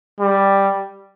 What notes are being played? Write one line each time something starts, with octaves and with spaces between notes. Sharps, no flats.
G3